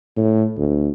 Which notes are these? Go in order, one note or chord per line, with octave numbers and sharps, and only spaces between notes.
A2
D2